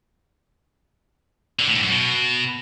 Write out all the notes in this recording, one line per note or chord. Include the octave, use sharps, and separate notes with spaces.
D3
A2
G#2
F#2
B2